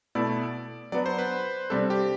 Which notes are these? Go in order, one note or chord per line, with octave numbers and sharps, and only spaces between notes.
B2 A3 E4 D5
F#3 B3 D4 D5
C5
B4
C3 G3 D4 A4
G4